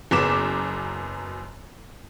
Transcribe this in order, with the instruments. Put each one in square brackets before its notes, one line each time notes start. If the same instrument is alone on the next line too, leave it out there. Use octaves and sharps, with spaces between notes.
[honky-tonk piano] F#1 F#2 B3 D6 B6 E7